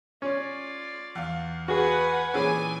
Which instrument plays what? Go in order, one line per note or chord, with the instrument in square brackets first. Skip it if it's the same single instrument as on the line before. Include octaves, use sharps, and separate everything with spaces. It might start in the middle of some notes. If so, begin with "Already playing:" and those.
[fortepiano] C#4 [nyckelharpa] F4 D5
[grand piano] E2 F5
[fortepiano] F#4 G#4 [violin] B4 F#5 [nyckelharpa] G#5
[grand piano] A#2 E3 C4 [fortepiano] C#4 G#4 B5 [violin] G#5 [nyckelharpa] D6